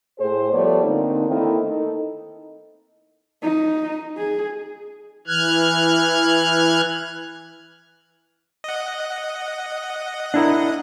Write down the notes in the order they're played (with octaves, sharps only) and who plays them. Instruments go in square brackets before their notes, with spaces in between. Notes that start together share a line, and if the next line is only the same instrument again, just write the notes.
[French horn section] A2 G#4 C5
F3 G3 A3 B3 C#5 D5
D3 A#3 C4 D#4
D#3 A3 A#3 C4 E4
D#4 A4
[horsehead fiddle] D#4
G#4
[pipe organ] E3 F6 F#6 G#6
[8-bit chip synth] D#5 F#5
[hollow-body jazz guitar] D4 E4 A#4